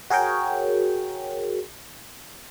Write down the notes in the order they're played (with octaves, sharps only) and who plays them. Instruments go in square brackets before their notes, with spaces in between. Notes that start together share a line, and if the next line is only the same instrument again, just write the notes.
[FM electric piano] F#4 G#4 A#4 C#5 G5